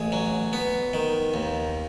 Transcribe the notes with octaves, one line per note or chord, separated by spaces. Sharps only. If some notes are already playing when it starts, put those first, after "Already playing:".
Already playing: A1 G#4
F#3
B3
D#3
D#2